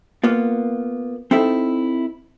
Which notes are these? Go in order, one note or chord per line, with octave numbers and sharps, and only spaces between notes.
A#3 B3 F4
C4 D#4 E4 A4 E5